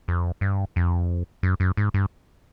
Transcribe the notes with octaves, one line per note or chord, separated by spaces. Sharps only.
F2
G2
F2
F#2
F#2
G#2
G2